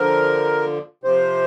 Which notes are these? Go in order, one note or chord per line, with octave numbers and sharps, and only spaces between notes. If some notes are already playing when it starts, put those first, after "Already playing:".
Already playing: D3 F3 A#4
C3 F3 C5